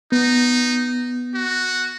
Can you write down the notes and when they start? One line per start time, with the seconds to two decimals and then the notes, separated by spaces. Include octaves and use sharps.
0.12 B3 D#4
1.34 F#4